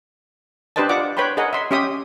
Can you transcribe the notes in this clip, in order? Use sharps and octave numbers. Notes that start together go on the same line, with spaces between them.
D4 G4 B4 C5 D#5 A5
F4 D5 F#5 D6
B4 C#5 G5 B5 C6
G#4 A#4 D#5 F#5
E5 C6
C#4 G4 E5 C6 D#6